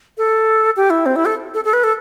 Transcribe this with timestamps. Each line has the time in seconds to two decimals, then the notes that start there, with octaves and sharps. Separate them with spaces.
0.18 A4
0.77 G4
0.90 E4
1.06 C4
1.16 E4
1.26 A4
1.54 A4
1.65 A4
1.73 B4
1.84 A4